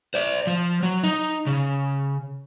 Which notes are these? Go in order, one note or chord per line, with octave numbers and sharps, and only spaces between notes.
C5 D5
F3
F#3
D#4
C#3